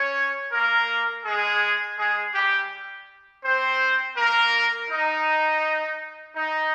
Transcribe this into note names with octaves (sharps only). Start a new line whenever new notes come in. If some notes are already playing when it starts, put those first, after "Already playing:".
Already playing: C#4 C#5
A#3 A#4
G#3 G#4
G#3 G#4
G3 G4
C4 C5
A#3 A#4
D#4
D#4